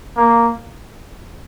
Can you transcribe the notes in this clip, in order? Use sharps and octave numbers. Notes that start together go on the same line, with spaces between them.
A#3